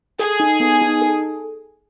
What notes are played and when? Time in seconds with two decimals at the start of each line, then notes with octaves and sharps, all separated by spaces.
0.19 G#4 A4
0.40 D#4
0.60 B3
0.81 D#4
1.02 A4